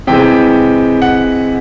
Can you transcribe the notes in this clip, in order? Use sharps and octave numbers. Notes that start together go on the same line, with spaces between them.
C3 E3 G#3 G5
F#5